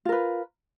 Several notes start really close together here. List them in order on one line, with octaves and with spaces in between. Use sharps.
F4 A#4 B4